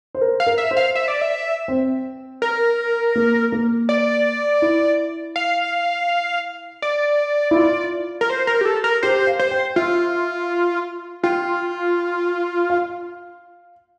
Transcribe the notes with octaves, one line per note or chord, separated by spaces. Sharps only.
C5
A#4
F5
A#4
E5
C5
F5
E5
D5
E5
C4
A#4
A#3
A#3
D5
E4
F5
D5
E4
F4
A#4
C5
A#4
G4
A4
A#4
G4 C5
F5
C5
G5
F4 E5
F4 G5
F5